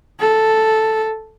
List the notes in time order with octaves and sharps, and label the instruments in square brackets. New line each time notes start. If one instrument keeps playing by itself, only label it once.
[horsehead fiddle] A4